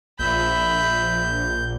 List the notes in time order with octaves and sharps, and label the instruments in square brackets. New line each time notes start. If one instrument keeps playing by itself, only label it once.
[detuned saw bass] A#1 [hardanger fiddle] E5 B5 [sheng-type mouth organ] G6